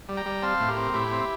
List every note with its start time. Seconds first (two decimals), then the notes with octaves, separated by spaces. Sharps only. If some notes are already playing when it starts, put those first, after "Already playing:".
0.09 G3
0.17 G5 A#5
0.26 G3
0.42 C4 F5 A5
0.60 A2
0.68 G4 A#4
0.77 C4
0.94 A2 E4 G4
1.11 C4